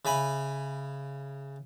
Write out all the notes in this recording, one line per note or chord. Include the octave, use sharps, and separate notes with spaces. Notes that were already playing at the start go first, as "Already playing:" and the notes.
C#3 E5 G#5 B5